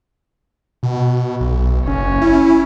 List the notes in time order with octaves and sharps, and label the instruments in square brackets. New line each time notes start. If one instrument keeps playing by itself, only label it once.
[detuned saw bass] B2
B1
[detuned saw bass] F#1 [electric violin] C#4
[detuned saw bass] E4